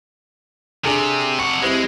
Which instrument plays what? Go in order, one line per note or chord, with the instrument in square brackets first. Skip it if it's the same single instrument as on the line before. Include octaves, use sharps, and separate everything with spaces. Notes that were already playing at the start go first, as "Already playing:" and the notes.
[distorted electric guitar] C3 [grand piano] D4 G#4 A4
[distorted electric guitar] C3 F#5 [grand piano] C#6
[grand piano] G3 C4 E4 [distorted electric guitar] G#3